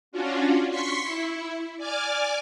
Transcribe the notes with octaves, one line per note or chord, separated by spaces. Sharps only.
C#4 D4 F4 F#4
C6 C#6 B6 C#7
E4
D5 G#5 D6 F6